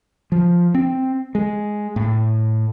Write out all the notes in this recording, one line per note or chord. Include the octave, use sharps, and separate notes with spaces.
F3
C4
G#3
A2